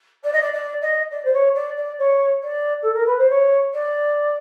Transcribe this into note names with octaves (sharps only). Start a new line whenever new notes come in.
D5
D#5
D5
D5
D#5
D5
C5
C#5
D5
D5
C#5
D5
A4
A#4
B4
C5
C#5
D5